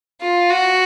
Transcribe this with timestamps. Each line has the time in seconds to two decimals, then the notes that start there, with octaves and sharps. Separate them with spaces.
0.21 F4
0.50 F#4